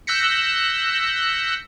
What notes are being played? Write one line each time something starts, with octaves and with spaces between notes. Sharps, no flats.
E6 F#6 G6 A#6 B6 C#7